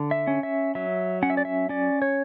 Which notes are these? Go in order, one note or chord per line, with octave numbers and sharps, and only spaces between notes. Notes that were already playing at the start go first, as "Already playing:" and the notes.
Already playing: D3
E5
C#4
E5
F#3 E5
C#4 F#5
E5
D5
E5
C#4 D5
C#5